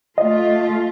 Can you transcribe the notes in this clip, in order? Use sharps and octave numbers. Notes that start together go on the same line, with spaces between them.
A3 F4 D#5